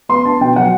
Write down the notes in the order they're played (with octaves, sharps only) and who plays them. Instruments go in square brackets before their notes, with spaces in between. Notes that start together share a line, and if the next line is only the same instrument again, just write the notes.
[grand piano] B3 C6
D4 A5
B2 G5
F#3 F#5